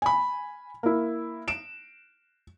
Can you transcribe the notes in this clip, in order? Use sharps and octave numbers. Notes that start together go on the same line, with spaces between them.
G#5 B5
A#3 E4
D7 E7